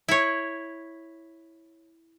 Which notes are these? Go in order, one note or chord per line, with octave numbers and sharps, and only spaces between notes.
E4 C#5